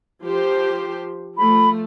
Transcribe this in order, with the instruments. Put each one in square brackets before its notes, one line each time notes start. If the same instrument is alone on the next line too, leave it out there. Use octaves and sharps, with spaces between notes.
[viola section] F3 G4 C5
[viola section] F3 A3 [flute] B5